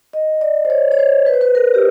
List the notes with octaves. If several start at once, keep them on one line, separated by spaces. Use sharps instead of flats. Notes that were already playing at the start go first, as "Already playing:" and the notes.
D#5
D5
C5
C#5
C#5
C5
B4
C5
B4
A#4
G4